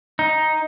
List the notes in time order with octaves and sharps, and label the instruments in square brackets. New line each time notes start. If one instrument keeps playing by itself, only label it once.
[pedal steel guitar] D#4